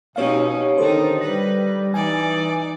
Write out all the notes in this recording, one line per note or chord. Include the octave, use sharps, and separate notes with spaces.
B2 C4 C#4 D#4 G4 C#5 F5
D3 D#3 D#4 A4 C5
G3 B4 A#6
E3 D#4 D5 G#5